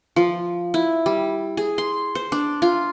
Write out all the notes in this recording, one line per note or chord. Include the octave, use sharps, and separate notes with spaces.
F3
E4
G3
G#4
C6
C5
D4
F4